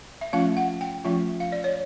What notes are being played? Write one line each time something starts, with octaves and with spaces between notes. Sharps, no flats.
E5
F3 A3 C#4 F4 F5
F#5
G5
F3 A3 C#4 F4 E5
F5
D5
C#5